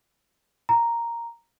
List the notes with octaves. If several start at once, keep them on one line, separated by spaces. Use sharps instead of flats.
A#5